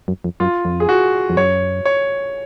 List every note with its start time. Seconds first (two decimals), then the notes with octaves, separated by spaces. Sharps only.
0.08 F#2
0.24 F2
0.40 F#2 F4
0.65 F2
0.80 G#4
0.89 F#4
1.30 F2
1.37 F#2 C#5
1.85 C#5